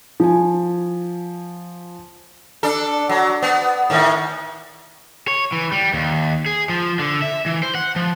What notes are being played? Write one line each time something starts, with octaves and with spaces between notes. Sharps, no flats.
F3 G#5
D4 A4
F#3
B3
A2 D#3
C#5
E3
G3
D#2
G#4
F3
D3
E5
E3
C5
F#5
F3